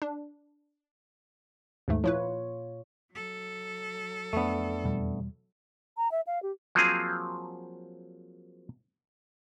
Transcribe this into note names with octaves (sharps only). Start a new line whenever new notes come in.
D4
D#2 G#2 A3
A#2 F3 E4 F4 B4 C#5
F#3 A4
F2 A3 B3 D4
E2 B2 G3
A#5
E5
F5
G4
F3 F#3 A#3 C4 F4 G#4